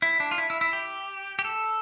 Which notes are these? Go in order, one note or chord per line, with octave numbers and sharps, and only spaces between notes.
E4
D4
F4
E4
E4
E4
G4
G4
A4